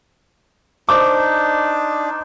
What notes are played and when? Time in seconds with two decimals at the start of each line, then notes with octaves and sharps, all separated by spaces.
0.89 D4 D#4 C5 D6